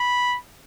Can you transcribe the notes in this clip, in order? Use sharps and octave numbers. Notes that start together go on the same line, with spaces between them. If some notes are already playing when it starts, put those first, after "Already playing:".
Already playing: B5